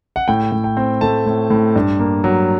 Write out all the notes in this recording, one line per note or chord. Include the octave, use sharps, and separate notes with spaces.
F#5
A2 G5
A2
G5
C4
A3 A5
A2
A2
G2
A#3
F#3